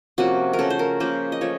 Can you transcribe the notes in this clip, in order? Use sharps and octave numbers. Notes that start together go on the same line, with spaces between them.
C3 F3 A#3 C#4 F#4
A#4
C#3 A3 C#4 A4
C5
A#4
C#3 F3 A#3 C#4 C5
D#5
F3 A3 C#5